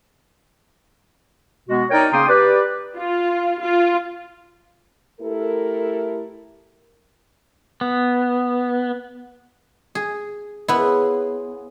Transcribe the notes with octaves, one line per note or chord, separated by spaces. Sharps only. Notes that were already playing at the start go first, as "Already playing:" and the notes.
B2 G#3 B3 F#4
D#4 A#4 C#5 D5 G5
C#3 A#3 C#4 G5 C6 D#6
G4 B4 D5
F4
F4
A3 E4 G4 A4 A#4
B3
G#4
C#3 B3 E4 G#4 C6